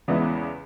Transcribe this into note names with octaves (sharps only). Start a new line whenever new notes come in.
E2 C#3 G#3 B3 E4